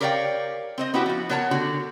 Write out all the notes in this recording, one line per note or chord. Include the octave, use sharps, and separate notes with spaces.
G4 A#4 C#5 D5 F5 G5
C4 C5 D#5
B3 C#4 E4 F#4 G4
F3 F#4
B3 A#4 C#5 F#5 A5
D3 F#4 G4